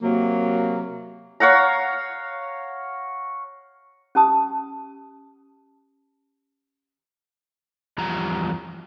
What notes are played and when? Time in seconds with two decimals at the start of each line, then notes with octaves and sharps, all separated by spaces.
0.02 C3 F#3 A#3
1.40 C#5 F5 F#5 A#5
4.15 C#4 G4 A5 D#6
7.98 E2 F3 G3 A#5